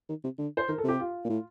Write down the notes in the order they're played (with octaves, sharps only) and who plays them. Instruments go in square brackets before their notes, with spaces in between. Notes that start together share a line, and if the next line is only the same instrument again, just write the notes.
[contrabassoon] D#3
C3
D3
[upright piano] C5
[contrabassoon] D#3 [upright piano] A#4
[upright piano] A4
[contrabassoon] C3 [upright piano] G4
[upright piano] F4
[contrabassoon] A#2
A2